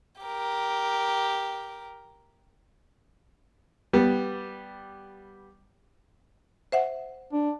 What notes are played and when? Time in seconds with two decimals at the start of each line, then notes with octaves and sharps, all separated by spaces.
0.22 G4 A#4
3.93 G3 B3
6.72 C5 E5 F#5
7.33 D4